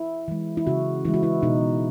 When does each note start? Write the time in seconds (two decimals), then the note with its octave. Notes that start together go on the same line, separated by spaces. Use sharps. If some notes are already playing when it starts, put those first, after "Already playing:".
Already playing: E4
0.28 E3 G#3
0.57 E4
0.67 C#3 F#4
1.05 E3 G#3 E4
1.14 F#4
1.23 E4
1.43 B2 D#4